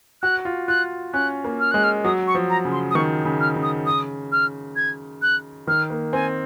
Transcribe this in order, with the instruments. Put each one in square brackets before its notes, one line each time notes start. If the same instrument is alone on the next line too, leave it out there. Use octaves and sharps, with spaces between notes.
[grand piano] F#4 [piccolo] F#6
[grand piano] F4
[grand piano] F4 [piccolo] F#6
[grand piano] C#4 [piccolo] F#6
[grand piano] A#3
[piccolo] F6
[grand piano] G#3 [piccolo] F#6
[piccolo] F6
[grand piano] F#3 [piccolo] D#6
[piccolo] C#6
[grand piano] F3
[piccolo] A#5
[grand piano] C#3
[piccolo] C6
D#6
[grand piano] D#3 [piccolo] C#6
[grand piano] C#3
[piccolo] F6
[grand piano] C#3
[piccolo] D#6
D#6
F6
G#6
F#6
[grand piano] D#3 [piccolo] F6
[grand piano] A#3
[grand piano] C4 [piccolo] G#5